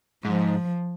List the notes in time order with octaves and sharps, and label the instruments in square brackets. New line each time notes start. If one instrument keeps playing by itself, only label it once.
[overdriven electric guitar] G#2 [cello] F3